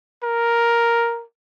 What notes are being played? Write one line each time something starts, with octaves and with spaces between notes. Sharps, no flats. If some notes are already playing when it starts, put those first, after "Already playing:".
A#4